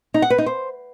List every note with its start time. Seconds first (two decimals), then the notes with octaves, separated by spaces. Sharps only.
0.14 D#4
0.22 F#5
0.30 B4
0.38 D#4
0.46 C5